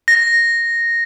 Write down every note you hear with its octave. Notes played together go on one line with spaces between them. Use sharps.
A#6